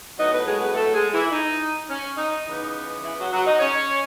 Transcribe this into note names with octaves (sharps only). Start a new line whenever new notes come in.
A2 F#3 B3 D#4 D#5
B3 B4
G#3 G#4
B3 B4
A3 A4
G#3 G#4
E3 E4
D#4
C#4
D#4
C#3 E3 B3 D#4
E3 E4
F#3 F#4
F#3 F#4
D#4 D#5
C#4 C#5